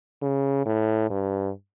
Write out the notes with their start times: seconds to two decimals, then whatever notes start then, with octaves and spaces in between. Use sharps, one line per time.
0.22 C#3
0.66 A2
1.10 G2